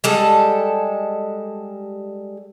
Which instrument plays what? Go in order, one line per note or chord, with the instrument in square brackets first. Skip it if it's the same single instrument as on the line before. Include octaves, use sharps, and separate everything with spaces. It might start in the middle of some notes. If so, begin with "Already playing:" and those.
[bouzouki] G3 G#3 A4